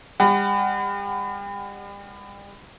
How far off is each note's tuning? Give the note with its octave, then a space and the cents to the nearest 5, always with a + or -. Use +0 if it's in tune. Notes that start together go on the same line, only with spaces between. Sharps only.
G3 +40 F#5 +25